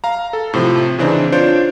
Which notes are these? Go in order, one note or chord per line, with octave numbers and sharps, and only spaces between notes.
F5 A#5
A4
A2 C3 F3
C#3 E3 C4 D4 D#4
D4 F4 C5 C#5 G6 D7